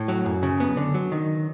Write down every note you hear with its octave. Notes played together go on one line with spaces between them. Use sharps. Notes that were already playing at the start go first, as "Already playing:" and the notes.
Already playing: A2
F#3
F#2
C#3
B3
D3
F#3
D#3